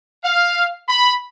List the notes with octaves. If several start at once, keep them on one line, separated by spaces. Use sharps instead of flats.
F5
B5